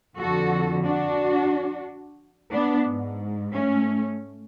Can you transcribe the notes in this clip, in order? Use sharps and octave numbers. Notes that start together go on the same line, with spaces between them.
F2 D3 F#4 A4
D4 F#4
B3 D4
G#2
A3 C#4